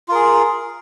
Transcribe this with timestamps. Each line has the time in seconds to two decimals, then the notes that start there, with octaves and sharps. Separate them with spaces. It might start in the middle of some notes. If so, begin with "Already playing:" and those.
0.08 F4
0.11 A#4
0.14 G#4